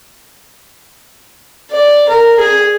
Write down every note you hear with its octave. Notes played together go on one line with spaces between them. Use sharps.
D5
A#4
G#4